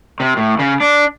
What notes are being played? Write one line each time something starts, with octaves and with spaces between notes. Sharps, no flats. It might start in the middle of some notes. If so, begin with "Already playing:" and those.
C3
A2
C#3
D4